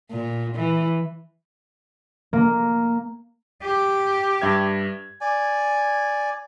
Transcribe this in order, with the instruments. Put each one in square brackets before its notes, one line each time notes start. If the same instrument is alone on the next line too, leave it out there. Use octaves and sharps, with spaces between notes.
[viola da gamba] A#2
E3
[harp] A#3
[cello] G4
[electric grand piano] G2 E5 G#6
[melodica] D5 G#5